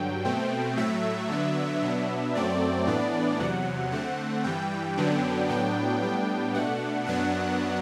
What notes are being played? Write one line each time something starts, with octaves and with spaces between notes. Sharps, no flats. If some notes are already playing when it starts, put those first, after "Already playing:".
Already playing: G2 D3 F#3 G5
B2 A3 C4
A2 F#3 A3 E5
D3 F#3 B3 D4
B2 F#3 B3 D4 E5
F#2 F#3 A3 C4 D5
A2 E3 B3 D4
E2 C3 F#3 F#5
D3 A3 C4 F#5
G2 E3 G3 G5
F#2 D3 F#3 B3 D4
A2 F#3 B3 D4 G5
A2 G3 B3 D4 G5
B2 A3 D4 F#5
F#2 F#3 B3 D4 F#5